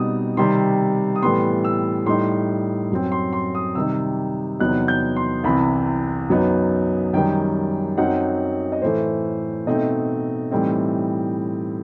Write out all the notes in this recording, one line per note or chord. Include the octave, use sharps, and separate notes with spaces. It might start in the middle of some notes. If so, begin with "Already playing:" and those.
Already playing: B2 G3 C4 D#4 D#6
C3 D#3 G3 C4 C6
D#6
A2 E3 G3 B3 C6
E6
A2 G3 D#4 C6
F#2 F#3 C4
C6
C6
D#6
C3 D#3 G3 D#4 E6
E2 C3 F#3 B3 D#4 F#6
G6
C6
C2 C3 E3 B5
F#2 F#3 B3 D#4
F#2 D#3 G3 G5
F#2 F#3 C4 D#4 F#5
D#5
A2 E3 A3 C5
B2 A3 C4 D#4 D#5
A2 E3 G3 C4 D#4